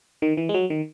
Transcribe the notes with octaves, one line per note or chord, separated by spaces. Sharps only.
D#3
E3
G#3
F#3
D#3